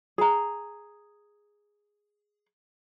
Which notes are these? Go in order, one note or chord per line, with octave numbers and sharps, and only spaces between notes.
G#4 A#5